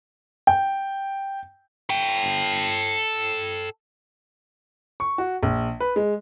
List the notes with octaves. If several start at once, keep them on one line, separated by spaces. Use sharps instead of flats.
G5
A4 G5
C#6
F#4
A#1
B4
G#3